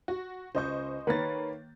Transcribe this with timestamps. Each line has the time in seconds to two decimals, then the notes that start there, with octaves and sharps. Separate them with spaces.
0.08 F#4
0.55 C#2 C5 D#5 C#6 G6
1.07 D#3 A#3 B4 C#5 A#5 A6